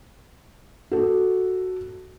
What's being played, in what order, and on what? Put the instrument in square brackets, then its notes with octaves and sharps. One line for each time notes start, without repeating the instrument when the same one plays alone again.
[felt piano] F#4 A4